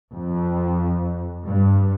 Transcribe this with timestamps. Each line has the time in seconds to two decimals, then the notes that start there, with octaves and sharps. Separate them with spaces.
0.15 F2
1.46 G2